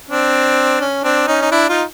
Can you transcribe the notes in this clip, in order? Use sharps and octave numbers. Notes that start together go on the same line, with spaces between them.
C4 D4
C#4
C4 D4
C#4 D#4
D#4
D4 E4
D#4 F4